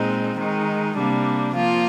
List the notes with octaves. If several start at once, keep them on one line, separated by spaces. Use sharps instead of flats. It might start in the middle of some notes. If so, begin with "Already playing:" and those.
Already playing: A#2 G#3 C4 D#4
D#3 G#3 D#4
C3 G3 A#3 D4
F3 A#3 F4